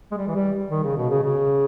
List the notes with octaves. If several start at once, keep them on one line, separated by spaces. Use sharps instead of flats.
G#3
G3
E3
G3
D#3
C#3
B2
C#3
C#3